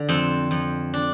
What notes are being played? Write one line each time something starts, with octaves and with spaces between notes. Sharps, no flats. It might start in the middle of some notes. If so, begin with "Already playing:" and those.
Already playing: D3
F2 C4
F2
D4